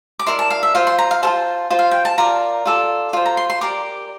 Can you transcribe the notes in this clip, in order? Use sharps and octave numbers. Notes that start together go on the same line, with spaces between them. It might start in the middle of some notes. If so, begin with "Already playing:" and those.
D6
E4 A#4 D5 C6
A5
F5
E5
F4 C5 F5
C6
A#5
F5
F4 A4 C5 A5
F4 C5
F5
G5
A5
F4 A#4 D5 A#5
F4 A4 D5
F4 C5
A#5
C6
C6
G4 A#4 D5 D6